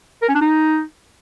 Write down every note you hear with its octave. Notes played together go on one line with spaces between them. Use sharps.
A#4
C#4
D4
D#4